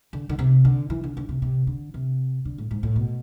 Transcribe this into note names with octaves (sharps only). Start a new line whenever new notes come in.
D3
D3
C3
D3
E3
D3
D3
C3
C3
D3
C3
D3
A2
G#2
A2
B2